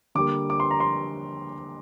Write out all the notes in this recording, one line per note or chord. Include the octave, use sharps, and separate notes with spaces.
D3 G3 A#3 D6
D6
C6
A#5
C6